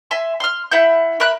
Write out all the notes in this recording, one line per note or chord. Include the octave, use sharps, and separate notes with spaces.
E5 G#5 C6
C6 F6
E4 E5 F#5 G6
A#4 E5 B5 F#6